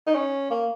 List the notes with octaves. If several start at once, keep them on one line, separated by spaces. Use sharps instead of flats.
D#4
C#4
A#3